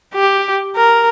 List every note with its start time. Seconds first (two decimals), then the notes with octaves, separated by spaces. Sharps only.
0.14 G4
0.76 A#4